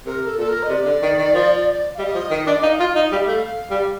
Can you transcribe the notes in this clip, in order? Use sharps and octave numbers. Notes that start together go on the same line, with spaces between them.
C3 A#4
A4
A#2 A4
A#4
D#5
C3 D5
D3
D#3
D#3
F3
F5
G3 D#5
F3
D#3
D4
D#4 F5
F4
D#4
G3
D#5
A3 F5
G3